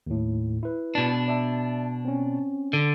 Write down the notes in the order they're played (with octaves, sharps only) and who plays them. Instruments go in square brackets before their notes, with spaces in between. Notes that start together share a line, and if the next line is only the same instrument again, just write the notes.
[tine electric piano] D#2 A2
E4 B4
[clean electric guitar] B2 D4
[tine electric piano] D5 E5 A5
C4 C#4
[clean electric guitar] D3